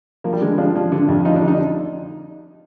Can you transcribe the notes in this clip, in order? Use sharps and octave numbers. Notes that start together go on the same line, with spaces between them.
F3 A#3
G3
D3 G#3
F3 D4
F3
D3
F2
F3 D#4
D4
D3
D#4